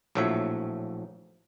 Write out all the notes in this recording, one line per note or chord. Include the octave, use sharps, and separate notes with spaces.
A#1 A2 F3 F#3 C#5 E5